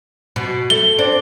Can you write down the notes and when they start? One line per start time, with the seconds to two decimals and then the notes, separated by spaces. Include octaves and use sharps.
0.36 B2
0.70 A3 G7
0.98 C4 D4